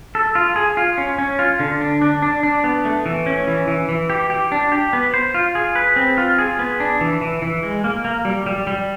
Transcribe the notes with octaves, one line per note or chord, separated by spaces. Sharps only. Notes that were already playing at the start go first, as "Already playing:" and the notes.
A4
F4
G#4
F4
C#4
C#4
F4
D3
D4
D4
D4
D4
B3
A3
E3
C#4
E3
E3
E3
G4
G4
D4
G4
B3
C5
F4
G#4
B4
C4
F4
G#4
B3
D4
E3
E3
E3
G#3
A#3
A#3
G3
G3
G3